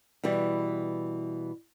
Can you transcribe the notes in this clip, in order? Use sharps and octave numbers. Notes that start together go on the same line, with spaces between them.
B2 E3 G3